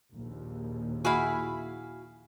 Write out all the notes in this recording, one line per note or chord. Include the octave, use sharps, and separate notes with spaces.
A#1 D#2
E4 F#4 G#4 F5 B5